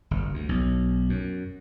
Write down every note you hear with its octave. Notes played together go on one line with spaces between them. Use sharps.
G1
D2
B1
F#2